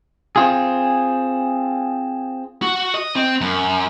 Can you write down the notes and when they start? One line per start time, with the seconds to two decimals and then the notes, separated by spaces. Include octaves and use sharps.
0.36 C4 F4 G#4
2.62 F#4
2.94 D#5
3.16 C4
3.41 F#2